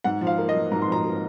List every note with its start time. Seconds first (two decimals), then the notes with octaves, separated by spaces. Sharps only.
0.04 G#2 F#5
0.21 F3
0.27 F5
0.38 A#3
0.49 D#5
0.55 G#2
0.71 G#2 A#5
0.82 C6
0.88 F3 A#5
1.05 A#3